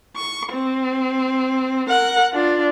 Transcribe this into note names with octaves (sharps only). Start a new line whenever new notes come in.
C#6
C4
A#4 F#5
D4 F4